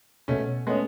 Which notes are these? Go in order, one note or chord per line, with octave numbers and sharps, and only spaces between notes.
B2 A3 C#4
G#3 A3 B3 C#4